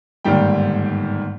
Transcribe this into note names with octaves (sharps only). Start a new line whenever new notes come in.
G1 G#2 D#3 G3 A#3 G5